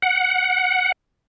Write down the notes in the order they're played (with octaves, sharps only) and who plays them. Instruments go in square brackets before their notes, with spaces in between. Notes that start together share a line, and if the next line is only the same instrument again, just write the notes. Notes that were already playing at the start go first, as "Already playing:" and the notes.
[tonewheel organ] F#5